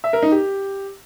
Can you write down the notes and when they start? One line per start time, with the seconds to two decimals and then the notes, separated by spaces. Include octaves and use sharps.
0.04 E5
0.13 A#4
0.22 D#4
0.32 G4